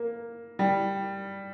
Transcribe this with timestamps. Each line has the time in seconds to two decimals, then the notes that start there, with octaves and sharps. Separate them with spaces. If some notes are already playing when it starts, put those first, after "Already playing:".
Already playing: A#3
0.59 G3